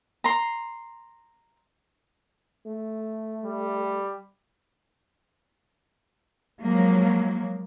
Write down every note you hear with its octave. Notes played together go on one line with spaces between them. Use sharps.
A#5 C6
A3
G3
F3 F#3 G#3 A#3